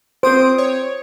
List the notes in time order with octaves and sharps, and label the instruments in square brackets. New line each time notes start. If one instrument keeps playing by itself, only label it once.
[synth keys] C4 D#6 D7 [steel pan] C5
[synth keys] C#5